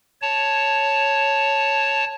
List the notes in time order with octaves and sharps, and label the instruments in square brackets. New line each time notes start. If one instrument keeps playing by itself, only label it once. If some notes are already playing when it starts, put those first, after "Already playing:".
[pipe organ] C#5 A5